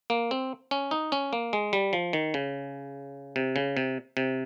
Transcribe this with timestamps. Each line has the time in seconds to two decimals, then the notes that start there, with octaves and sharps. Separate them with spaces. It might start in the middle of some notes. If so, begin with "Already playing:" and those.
0.10 A#3
0.31 C4
0.71 C#4
0.91 D#4
1.12 C#4
1.33 A#3
1.53 G#3
1.73 G3
1.93 F3
2.13 D#3
2.34 C#3
3.36 C3
3.56 C#3
3.77 C3
4.17 C3